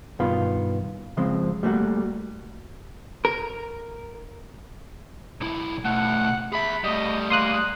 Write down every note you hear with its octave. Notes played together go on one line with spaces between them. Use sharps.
G2 B2 D#3 B3 F4
C#3 F3 G#3 C4
G3 A3 A#3 F#4
A#4
B1 E4
B2 A3 F#5
G#4 E5 B5
G3 A3 D#5
A#3 C6 D#6 F#6